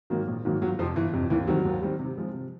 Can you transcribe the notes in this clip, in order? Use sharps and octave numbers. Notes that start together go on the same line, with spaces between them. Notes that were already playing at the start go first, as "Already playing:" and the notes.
G#2 D#3 F#3 A#3
A#1
G#2 D#3 F#3 A#3
G1 F#3
F2 C3 F3
G1 E3
F2 C3
D#2 E3
D#3 F#3 G3 C4
D#2
D#3 G3 C4
C3
F3 G#3
C3